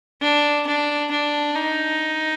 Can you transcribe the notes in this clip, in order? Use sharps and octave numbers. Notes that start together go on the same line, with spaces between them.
D4
D4
D4
D#4